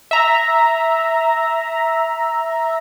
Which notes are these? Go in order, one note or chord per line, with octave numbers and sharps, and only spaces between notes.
E5 A#5